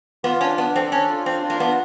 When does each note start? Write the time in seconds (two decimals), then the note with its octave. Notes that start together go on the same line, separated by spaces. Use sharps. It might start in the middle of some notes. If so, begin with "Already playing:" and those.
0.24 B3 F4
0.41 C#4 D4
0.58 B3 D4
0.75 C4 A4
0.92 C#4 D4
1.09 F4
1.26 C4 D4
1.43 F4
1.50 A#3
1.60 B3 D4